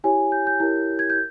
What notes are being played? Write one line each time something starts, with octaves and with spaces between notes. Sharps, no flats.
E4 G4 C#5 G#5
G6
G6
E4 G4 A#4 C#5
G#6
G6